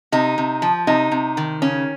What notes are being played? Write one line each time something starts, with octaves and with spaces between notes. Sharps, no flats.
C3 D#4
C3
F3
C3 D#4
C3
D#3
C#3 C#4